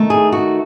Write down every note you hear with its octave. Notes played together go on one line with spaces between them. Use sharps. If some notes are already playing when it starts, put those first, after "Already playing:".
Already playing: D#3 A3 D#4
G#4
F#4